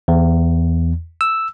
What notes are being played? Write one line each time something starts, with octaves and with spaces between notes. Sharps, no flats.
E2
E6